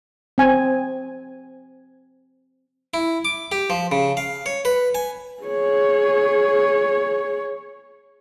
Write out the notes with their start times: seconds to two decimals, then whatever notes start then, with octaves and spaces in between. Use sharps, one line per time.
0.38 C4 G#5
2.94 E4
3.25 D6
3.52 G4
3.70 F3
3.92 C#3
4.17 F5
4.46 C#5
4.65 B4
4.95 G#5
5.43 G#4 C#5